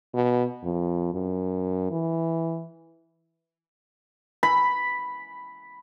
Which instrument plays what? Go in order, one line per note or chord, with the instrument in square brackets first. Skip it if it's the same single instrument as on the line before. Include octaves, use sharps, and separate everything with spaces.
[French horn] B2
F2
F#2
E3
[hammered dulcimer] B5